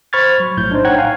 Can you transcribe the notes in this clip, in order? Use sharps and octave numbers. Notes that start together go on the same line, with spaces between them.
C5 B5 C#6 F6 G#6 A6
F#3
A#1 A2 G6
D4 D#4 C5
C#5 F#5 G5 A#5 F#6 G#6
F5 G#5